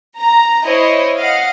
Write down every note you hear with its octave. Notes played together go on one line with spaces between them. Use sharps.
A#5
E4 C5 C#5 D#5
D#5 F5 F#5